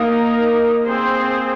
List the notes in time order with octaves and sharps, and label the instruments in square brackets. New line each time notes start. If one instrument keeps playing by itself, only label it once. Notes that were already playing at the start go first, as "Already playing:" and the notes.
Already playing: [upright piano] A#3 [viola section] D#4 A#4 D#5
[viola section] C4 G#4 C5